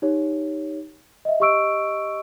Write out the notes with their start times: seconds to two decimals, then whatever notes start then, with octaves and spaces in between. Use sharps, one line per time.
0.02 D#4 G4 C#5
1.25 D#5 E5
1.40 G4 D#5 C#6 E6 D7